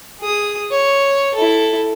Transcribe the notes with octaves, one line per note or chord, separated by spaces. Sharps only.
G#4 D#6
C#5
E4 A4